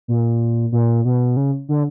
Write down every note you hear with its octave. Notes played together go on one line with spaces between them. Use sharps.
A#2
A#2
B2
C#3
D3